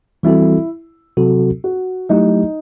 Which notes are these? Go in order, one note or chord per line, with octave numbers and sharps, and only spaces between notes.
E3 G3 C4 E4 F#4 A4
C3 F#3 C4 F#4 A4
F#4
F#3 A3 D#4 E4 G4